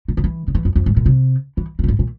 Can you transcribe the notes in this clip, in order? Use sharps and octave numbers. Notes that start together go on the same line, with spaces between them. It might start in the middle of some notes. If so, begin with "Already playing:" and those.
A#2
C#3
E3
C#3
E3
F2
F2
G#2
A#2
C3
E3
E3
A#2
G#2
A#2